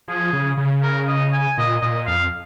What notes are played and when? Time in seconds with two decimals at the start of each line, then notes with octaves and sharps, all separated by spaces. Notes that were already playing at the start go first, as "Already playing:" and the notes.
0.08 F3 G#4
0.33 C#3
0.57 C#3
0.83 A#4
1.08 D#5
1.33 G#5
1.58 A#2 D#5
1.82 A#2 D#5
2.07 F2 F5